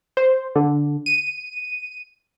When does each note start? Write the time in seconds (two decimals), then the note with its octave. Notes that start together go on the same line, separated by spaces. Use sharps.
0.17 C5
0.55 D3
1.06 D#7